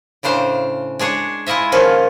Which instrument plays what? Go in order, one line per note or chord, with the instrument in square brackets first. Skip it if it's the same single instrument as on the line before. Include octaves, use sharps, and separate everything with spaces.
[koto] A2 C#3 D4 C5 F5
G#3 D4 G#4 C#5
G#3 E4 F4 D#5 E5
A#2 D#3 F3 C#4 F4